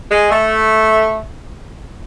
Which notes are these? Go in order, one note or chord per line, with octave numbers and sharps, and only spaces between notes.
G#3
A3